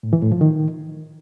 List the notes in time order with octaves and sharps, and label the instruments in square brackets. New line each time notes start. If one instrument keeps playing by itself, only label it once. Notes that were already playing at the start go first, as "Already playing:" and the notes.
[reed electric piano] A2
E3
A2
F3
D#3